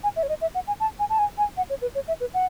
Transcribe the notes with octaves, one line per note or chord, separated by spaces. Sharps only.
G#5
E5
C#5
D#5
E5
F#5
G#5
A5
G#5
A5
G#5
G#5
F#5
C#5
B4
C#5
E5
B4
F#5